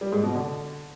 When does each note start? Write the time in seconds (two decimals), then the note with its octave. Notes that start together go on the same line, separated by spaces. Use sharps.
0.01 G3
0.12 G#2
0.23 B2
0.35 D3